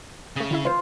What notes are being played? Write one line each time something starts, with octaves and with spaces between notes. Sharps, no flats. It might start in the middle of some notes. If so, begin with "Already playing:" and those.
C#3 A3 D#6
D3 E4 E5
F4 B4 C5